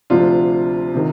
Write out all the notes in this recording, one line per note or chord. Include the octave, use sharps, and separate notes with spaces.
D2 C3 F3 D4 F4
C3 D#3